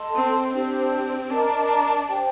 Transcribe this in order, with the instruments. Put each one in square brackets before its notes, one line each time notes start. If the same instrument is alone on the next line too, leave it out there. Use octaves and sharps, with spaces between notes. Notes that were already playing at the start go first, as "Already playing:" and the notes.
Already playing: [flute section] A4 D#5 A5 C6
[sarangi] C4
[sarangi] C4 [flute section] D4 G4 C5
[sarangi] D4 [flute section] A#4 D#5 A#5
[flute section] G4 C5 G5